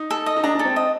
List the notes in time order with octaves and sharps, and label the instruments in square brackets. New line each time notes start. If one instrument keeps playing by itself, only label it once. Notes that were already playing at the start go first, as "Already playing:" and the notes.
Already playing: [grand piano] D#4
[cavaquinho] A4
D#5
[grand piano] D#4
[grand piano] D4 [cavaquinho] A#5
[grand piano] D4
[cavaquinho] A4
[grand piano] C4
[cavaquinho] D#5